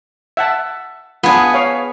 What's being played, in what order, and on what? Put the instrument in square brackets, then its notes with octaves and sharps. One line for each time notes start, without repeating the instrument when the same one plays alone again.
[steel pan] E5 F#5 A5
[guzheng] B3 G#4 [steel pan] D4 F4
[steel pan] C#5 F5